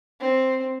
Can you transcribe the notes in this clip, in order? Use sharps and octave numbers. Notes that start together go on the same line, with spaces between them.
C4